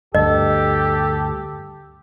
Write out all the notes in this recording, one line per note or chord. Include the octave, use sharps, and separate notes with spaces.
D2 G2 G4 A4 D#5